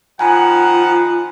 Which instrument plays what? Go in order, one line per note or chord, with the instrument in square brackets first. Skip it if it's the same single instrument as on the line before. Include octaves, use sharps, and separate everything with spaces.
[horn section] D#3 F3 F#5 [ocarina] F4 [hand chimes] G#5 A#5 B5